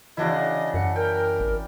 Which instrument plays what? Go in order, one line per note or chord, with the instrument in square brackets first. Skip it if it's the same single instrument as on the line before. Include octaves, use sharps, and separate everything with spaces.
[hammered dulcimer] C#3 D4 E4 [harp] E3 F#4 D5 [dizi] D#5
[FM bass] F#2 [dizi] F#5
[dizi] A#4 [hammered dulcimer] G5
[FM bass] G#1